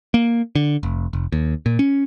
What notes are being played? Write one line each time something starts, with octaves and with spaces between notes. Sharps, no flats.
A#3
D3
F1
F1
D#2
A#2
C#4